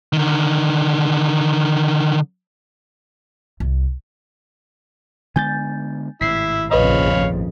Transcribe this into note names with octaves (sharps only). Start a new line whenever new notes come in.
D3 D#3
C2
D3 G#3 B3 G#5 G6 A6
G#1 A2 C3 E4 B6 C7
A#1 F2 C#3 B4 C#5 D#5 F5 B5